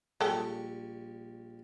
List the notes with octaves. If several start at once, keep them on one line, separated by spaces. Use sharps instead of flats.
A#1 G3 G#3 A4 G5 C#6